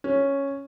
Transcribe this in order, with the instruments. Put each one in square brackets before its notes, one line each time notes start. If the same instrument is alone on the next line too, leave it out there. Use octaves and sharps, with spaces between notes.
[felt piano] C#4